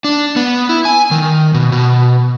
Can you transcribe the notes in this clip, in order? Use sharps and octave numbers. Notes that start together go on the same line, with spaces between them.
D4
B3
E4
G#5
D#3
B2
B2